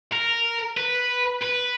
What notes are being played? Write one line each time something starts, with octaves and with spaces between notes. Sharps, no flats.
A#4
B4
B4